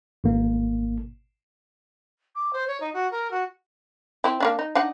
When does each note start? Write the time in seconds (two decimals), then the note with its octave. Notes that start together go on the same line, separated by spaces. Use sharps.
0.24 G#1 A#3
2.35 D6
2.53 C5
2.67 C#5
2.80 D#4
2.93 F#4
3.11 A#4
3.31 F#4
4.24 C4 E4
4.40 A#3 C#4 D4
4.59 D#4
4.75 D4 D#4 F#5